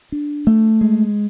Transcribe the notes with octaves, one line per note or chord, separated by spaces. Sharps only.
D4
A3
G#3